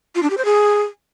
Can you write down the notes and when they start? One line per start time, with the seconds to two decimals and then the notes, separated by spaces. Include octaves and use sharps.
0.15 F4
0.23 D4
0.30 G4
0.38 C5
0.45 G#4